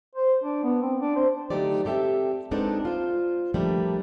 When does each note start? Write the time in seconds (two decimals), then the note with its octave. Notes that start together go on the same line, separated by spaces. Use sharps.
0.15 C5
0.44 D4
0.63 B3
0.82 C4
1.00 D4
1.16 C5
1.50 D3 F#3 A3 D#4 G4 D5
1.85 C4 G4 A4 E5 G5
2.51 G#3 B3 C4 D4 D#4 A4
2.85 F4 C5
3.54 F3 G3 A3 A#3 D4